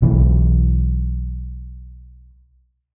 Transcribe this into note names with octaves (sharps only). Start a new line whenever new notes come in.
B1 E3